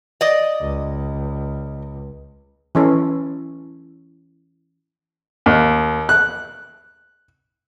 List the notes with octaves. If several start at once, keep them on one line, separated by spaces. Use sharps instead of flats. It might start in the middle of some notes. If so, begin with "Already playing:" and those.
D5 D#5
C#2
E3 C#4 A4
D#2
F#6